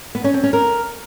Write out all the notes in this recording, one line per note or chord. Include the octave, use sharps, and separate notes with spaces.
B3
C#4
C4
C#4
A#4